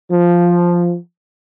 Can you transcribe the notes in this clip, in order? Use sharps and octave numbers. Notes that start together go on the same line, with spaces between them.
F3